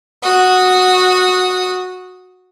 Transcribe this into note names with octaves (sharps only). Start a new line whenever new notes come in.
F#4 D#6